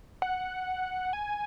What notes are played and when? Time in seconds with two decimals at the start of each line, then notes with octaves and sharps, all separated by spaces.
0.22 F#5
1.13 G#5